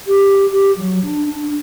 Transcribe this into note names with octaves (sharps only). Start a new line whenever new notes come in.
G4
G4
F#3
D4
D4